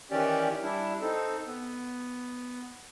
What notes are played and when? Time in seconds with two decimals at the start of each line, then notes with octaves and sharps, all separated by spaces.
0.11 D#3 E3 C#4 G4 D5
0.62 G3 D4 E4
1.01 C4 D#4 A4
1.46 B3